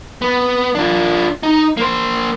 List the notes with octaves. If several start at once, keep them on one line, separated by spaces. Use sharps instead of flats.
B3
D4 F4
D#4
A#3 C5